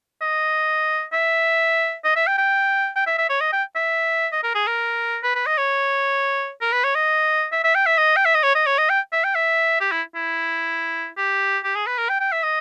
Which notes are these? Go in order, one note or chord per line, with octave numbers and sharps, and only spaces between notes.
D#5
E5
D#5
E5
G5
G5
G5
E5
E5
C#5
D#5
G5
E5
D#5
A#4
G#4
A#4
B4
B4
D#5
C#5
A#4
B4
C#5
D#5
E5
E5
G5
E5
D#5
G5
E5
D#5
C#5
D#5
C#5
D#5
G5
E5
G5
E5
G4
E4
E4
G4
G4
G#4
B4
A#4
G5
G5
E5
D#5